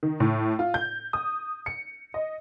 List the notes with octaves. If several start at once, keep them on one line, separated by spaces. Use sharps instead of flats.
D#3
A2
F4
G6
D#6
C#7
D#5